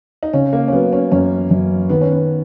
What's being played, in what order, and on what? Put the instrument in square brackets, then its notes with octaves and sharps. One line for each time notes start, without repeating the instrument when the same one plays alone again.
[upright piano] D#4
[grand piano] C#3 [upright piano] C#4
[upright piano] A#3
C#4
[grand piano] F#3 [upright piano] B3
[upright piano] C#4
[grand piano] F#2 [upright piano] C#4
[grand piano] F#2
[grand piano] D#3 [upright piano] B3
[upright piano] C#4
B3